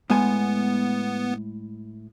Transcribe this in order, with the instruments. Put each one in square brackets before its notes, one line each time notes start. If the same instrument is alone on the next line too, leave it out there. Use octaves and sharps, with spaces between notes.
[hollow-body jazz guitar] A2 G#3 G#5 [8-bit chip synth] B3